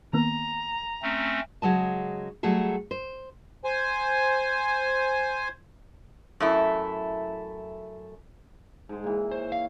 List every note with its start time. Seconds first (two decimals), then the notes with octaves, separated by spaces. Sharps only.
0.13 D#3 A#3 B3 A#5
1.03 A3 C4 C#4
1.62 C#3 F#3 G#3 A5
2.43 F#3 G3 A3 G#4 A4
2.91 C5
3.64 C5 G#5
6.40 F#2 A3 E4
8.89 G#2 G#3
9.04 A#2 E3
9.31 C5 C#5
9.52 F5